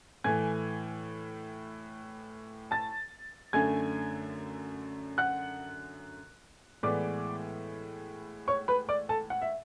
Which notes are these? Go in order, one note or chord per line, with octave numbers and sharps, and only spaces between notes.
A2 E3 A3 G#5 G#6
A5 A6
F#2 D3 A3 G#5 G#6
F#5 F#6
A2 E3 G#3 B3 D5 D6
C#5 C#6
B4 B5
D5 D6
A4 A5
F#5
E5